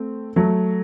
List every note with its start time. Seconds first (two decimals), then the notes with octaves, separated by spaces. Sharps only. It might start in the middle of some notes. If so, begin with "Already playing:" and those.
Already playing: A3 C4
0.36 F#3 A3